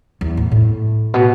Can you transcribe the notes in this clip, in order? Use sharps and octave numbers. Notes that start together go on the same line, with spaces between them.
E2
A2
A2
B2